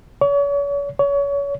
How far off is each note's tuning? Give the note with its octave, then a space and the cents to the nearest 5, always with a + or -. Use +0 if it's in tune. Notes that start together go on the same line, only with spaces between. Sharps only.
C#5 +40
C#5 +30